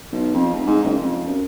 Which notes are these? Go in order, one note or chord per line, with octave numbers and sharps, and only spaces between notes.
B1
F2
F1
G#2
F#1
F2
F#2